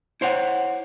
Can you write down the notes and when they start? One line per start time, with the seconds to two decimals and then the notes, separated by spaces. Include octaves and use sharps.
0.21 E4 C5 C#5 F5 F#5